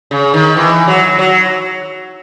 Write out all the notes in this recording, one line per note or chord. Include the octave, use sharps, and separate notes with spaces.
C#3
D#3
E3
F#3
F#3